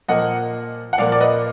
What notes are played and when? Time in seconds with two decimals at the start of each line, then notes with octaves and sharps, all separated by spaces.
0.08 A#2 F3 A#3 D#5 F#5
0.93 F#5
0.98 A#2 F3 A#3 D5 F5
1.12 D5
1.20 B4 D#5